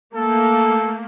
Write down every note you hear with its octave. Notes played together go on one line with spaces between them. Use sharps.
A3 A#3 A4